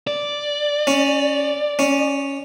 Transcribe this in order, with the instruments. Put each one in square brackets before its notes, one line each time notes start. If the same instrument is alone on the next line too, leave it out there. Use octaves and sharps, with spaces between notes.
[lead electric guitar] D5
[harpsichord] C#4
C#4